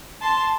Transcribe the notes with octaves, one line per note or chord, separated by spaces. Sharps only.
A5 C6